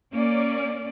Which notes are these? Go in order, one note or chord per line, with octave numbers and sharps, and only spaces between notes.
A#3 C#4 D5